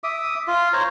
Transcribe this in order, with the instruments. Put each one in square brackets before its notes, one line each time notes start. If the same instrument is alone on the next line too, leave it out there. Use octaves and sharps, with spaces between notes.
[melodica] E5 D6 D#6
F4
C5 C#5 A#5